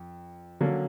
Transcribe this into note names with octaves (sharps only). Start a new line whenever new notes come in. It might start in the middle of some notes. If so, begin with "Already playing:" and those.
Already playing: F2
D3 F#3 A#3 C#4